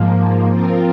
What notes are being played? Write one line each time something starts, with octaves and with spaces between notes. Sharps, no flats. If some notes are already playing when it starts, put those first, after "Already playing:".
Already playing: G#2 F3 A#3
F3 C4 F4 A#4